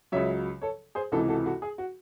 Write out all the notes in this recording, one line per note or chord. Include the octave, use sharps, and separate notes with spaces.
C#2 C#3 F#3 C#5 E5
A4 C#5
G#4 C5
C#2 C3 E3 F#4 A4
F#4 A4
F#4 A4
G#4
F#4